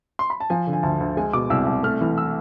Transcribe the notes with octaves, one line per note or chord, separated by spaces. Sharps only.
C6
B5
A5
F3 G#5
D3
G#5
D2 A5
D2
G#3 G#5
B2 D6
C2 E6
C2
A3 F6
E3
E6